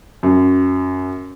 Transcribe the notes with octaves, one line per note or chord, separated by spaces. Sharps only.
F#2